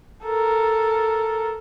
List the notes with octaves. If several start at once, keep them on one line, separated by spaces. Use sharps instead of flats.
A4 A#4